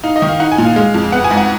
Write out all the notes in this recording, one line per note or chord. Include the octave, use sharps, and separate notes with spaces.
D#4 F5
D#5
D#3
F5
D#4 F#5
G#5
A#2
F5
G#3 F5
F2
B3 F#5
G#5
G#2
F#5